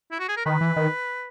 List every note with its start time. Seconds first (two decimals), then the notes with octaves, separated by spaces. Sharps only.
0.12 E4
0.19 F#4
0.28 G#4
0.37 A#4
0.45 D#3 B4
0.61 E3
0.76 D#3